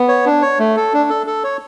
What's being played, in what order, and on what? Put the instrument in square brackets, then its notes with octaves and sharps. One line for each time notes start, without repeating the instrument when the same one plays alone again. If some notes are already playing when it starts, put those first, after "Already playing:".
Already playing: [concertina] B3
C#5
D4
C#5
A3
A4
D4
A4
A4
C#5